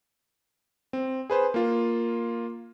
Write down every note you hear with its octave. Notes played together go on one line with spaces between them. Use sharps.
C4
G#4 B4 C5
A#3 F4